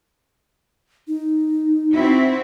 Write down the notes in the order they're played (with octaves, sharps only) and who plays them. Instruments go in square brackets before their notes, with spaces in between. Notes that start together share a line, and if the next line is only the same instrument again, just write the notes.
[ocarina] D#4
[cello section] C4 E4 F#4